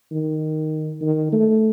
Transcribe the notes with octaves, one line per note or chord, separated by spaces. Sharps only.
D#3
D#3
A3